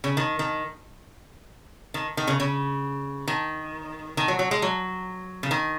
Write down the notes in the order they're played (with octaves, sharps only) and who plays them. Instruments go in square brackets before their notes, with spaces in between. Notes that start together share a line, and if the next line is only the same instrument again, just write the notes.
[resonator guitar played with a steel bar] C#3
D#3
D#3
D#3
D#3
C#3
C#3
D#3
D#3
F#3
F#3
G#3
F#3
C#3
D#3